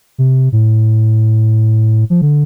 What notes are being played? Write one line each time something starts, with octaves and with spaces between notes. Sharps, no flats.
C3
A2
F3
D3